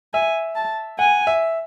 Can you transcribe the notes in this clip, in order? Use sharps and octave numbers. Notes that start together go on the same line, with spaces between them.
E5 G#5
A5
F#5 G#5
E5